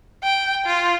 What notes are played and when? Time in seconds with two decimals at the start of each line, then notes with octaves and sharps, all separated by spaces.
0.23 G5
0.66 F4